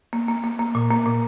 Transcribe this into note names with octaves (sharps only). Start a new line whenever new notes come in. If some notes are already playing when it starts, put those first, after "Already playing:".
A#3
A#3
A#3
A#3
A#2
A#3
A#2